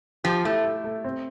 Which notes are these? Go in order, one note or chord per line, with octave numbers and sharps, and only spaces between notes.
F3 G4
A3 E4
A3
A3
C4